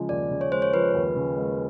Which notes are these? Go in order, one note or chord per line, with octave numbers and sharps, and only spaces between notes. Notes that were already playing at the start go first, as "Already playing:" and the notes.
Already playing: C#3 F3 G#3
D#2 D5
C#3
C#5
G#3 C5
C#5
F3 B4
D#2
C#3
G#3